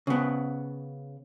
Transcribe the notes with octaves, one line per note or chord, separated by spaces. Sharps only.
C#3 B3